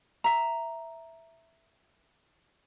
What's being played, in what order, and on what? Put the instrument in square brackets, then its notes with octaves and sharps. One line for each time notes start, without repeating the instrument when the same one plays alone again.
[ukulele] E5 A#5